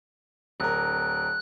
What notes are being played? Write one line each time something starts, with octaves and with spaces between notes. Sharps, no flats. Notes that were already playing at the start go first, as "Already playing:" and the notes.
D1 A#4 F#6